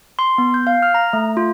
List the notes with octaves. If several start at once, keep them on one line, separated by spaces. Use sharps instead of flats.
C6
B3
G6
F5
F6
A#5
A3
F4